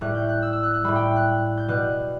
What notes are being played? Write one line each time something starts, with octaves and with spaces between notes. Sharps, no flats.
A2 G3 F#6
G6
F#6
E6
E6
F#6
F#6
A2 G3 B5
G5
F#6
G6
B2 G3 F#6